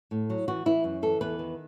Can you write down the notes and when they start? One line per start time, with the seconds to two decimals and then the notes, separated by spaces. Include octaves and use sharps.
0.11 A2
0.30 F#3
0.48 E3 F#4
0.66 E3 E4
0.84 F#2
1.02 E3 A4
1.21 E2 B4
1.39 D#3